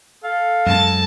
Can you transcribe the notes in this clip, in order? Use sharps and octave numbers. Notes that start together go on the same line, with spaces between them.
A4 F5
F#2 G#3 A5